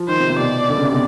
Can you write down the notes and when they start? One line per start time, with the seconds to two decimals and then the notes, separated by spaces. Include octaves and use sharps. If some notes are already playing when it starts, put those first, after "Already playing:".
Already playing: F3
0.08 D#3 C5
0.19 C3
0.29 C3
0.39 B2 D5
0.69 D3
0.76 C#3
0.84 C3
0.92 B2